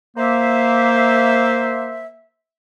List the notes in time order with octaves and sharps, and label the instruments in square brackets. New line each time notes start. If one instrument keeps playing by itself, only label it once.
[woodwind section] A#3 C5 E5